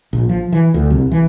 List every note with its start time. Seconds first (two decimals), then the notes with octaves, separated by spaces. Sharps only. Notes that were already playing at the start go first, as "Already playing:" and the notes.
0.13 A#1
0.29 F3
0.52 E3
0.74 D2
0.90 C2
1.12 E3